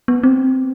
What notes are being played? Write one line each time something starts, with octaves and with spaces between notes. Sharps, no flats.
B3
C4